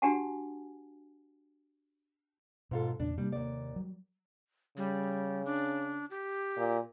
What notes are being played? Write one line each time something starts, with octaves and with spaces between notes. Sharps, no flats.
D4 F#4 G4 F#5 G#5 A5
G#2 B2 F4 A4
E2 A#2 C#3 D4
C3 G3 A#3 C4 D4
D#2 D5
F#3 G3
C#3 G3
D4
G4
A#2